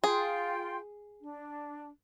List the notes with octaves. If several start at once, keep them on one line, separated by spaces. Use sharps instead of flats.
F4 G#4 G5 C6
D4